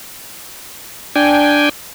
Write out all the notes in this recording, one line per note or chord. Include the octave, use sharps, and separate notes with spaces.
D4 G5 G#5